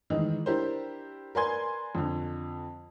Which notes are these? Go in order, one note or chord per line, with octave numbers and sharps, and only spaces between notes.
D#3 E3 G#3
D4 E4 G4 A#4 C5
A#4 B4 D5 G#5 C6 G#6
F2 D3